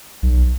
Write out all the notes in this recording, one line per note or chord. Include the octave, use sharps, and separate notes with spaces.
B1